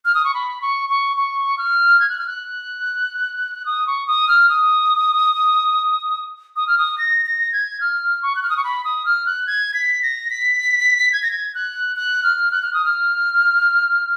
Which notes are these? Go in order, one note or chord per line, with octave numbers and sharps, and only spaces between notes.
F6
D#6
C#6
B5
C#6
C#6
C#6
F6
G#6
F#6
F6
F#6
D#6
C#6
D#6
F6
D#6
D#6
F6
D#6
A#6
A#6
G#6
F6
C#6
F#6
F6
D#6
C#6
B5
D#6
F6
F#6
G#6
B6
A#6
B6
G#6
A#6
G#6
F#6
F#6
F6
F#6
F6
D#6
F6